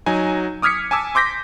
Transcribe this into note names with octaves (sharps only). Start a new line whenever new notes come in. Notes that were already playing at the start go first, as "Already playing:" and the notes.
F#3 D#4 G#5
D6 D#6 F6 G#6 B6 C#7
G#5 A5 D6 E6
C6 D6 G6 A#6 B6